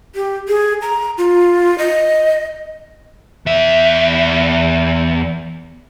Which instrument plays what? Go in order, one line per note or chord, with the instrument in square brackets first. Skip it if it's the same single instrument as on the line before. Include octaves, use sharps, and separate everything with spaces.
[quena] G4
G#4
A#5
F4
D#5
[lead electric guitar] E2 E5